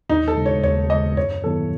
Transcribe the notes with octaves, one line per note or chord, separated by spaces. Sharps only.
D#2 D#4
A4
C#3 G#3
C#5
D#2 C#5
C#3 G#3 D#5
F#2 C#5
D#3 F#3 B3 E4 A4